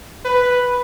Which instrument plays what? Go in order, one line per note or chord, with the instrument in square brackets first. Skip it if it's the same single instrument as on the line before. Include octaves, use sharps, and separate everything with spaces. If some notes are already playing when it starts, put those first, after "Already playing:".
[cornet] B4